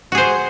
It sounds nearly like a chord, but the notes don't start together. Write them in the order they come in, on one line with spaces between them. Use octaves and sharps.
F#4 G#4 C5